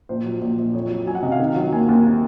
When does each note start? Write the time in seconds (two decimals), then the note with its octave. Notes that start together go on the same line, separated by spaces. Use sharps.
0.09 A#1 C5
0.25 F#3
0.41 A#1
0.58 A#1
0.74 F2 C#5
0.90 F#3
1.06 F#3 G#5
1.15 F#5
1.22 C3 D#5
1.32 F5
1.39 D#3 F#5
1.56 F#3
1.73 D#2 G#5
1.89 D#2